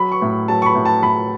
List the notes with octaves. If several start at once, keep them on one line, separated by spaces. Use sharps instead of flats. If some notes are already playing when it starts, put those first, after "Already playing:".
Already playing: F#3 B5
C#6
A2
F#3 A5
C#6
B5
A2
A5
A2 B5